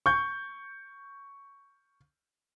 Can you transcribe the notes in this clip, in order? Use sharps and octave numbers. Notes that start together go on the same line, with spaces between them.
C#6 G6